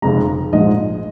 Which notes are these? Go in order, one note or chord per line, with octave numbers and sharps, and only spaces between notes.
F1 F2 C#3 G#3 A#5
A#1 G#2 F3 G#3 D#5